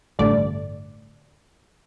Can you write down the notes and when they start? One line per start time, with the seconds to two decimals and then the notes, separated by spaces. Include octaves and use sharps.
0.19 A1 G2 D3 A3 D5